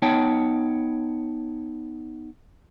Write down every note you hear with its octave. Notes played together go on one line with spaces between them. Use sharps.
B3 D#4 C#5 G5 A5